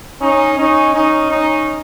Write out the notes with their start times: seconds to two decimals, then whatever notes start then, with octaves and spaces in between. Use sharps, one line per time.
0.21 C#4 D#4
0.58 C#4 D#4
0.94 C#4 D#4
1.30 C#4 D#4